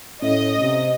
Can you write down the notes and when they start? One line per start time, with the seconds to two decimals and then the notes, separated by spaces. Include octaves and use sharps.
0.22 A2 C#4 D#5
0.60 C3